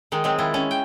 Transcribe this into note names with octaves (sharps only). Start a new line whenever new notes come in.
D#3 G#3 D#4
F#3 G#3 C4
D#3 E4 F4
C#4
G5